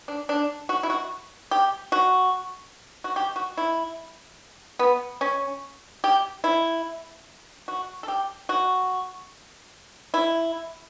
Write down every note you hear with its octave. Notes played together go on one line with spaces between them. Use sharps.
D4
D4
F#4
E4
F#4
G4
F#4
F#4
G4
F#4
E4
B3
C#4
G4
E4
F#4
A4
G4
F#4
E4